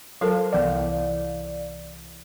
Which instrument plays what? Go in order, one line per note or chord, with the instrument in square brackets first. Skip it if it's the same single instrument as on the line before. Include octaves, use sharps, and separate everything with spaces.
[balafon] F#3 F4 A#4 [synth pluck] A4 C5 F5
[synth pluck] C2 E3 F5 [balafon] B3 F#5 [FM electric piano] D5